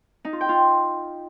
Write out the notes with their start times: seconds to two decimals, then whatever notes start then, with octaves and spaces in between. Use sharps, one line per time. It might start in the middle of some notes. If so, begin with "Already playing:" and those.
0.25 D#4
0.33 F4
0.41 G5
0.49 F4